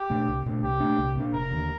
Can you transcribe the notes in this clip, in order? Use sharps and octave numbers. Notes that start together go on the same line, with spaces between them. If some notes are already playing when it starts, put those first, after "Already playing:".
Already playing: G4
A#2 A3 D4
C2
A#2 A3 D4
C2 G4
A#2 A3 D4
C2
A#2 A3 D4
F1 A#4
D#2 D3